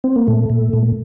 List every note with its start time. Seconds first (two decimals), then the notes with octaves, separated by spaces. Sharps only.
0.04 C4
0.16 A#3
0.27 A#2 A3
0.50 A#2
0.73 A#2